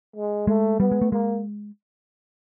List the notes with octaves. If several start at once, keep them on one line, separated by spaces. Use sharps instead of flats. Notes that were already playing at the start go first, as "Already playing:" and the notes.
G#3
G#3 A3
G3 B3
G#3
A3
G#3 A#3